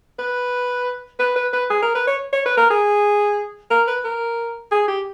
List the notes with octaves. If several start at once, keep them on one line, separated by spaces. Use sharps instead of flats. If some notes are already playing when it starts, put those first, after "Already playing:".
B4
B4
B4
B4
G#4
A#4
B4
C#5
C#5
B4
A#4
G#4
A#4
B4
A#4
G#4
G4